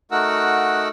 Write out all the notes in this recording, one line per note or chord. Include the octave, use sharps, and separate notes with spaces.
A3 D#4 F#4 A#4 F#5 E6